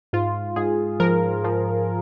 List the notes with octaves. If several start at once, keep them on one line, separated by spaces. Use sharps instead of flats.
G#2 F4
G#2 G#4
F3 A#4
F3